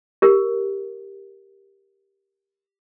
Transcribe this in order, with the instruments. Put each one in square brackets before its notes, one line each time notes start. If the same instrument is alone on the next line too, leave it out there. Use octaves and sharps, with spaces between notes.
[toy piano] G4 A#4